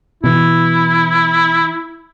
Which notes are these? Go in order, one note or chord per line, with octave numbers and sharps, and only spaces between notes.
B2 E3 E4